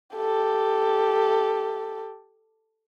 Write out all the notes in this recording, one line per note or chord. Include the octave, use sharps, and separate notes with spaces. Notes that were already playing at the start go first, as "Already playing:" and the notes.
G4 A4